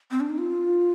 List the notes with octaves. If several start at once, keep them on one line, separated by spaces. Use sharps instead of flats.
C4
D4
D#4
F4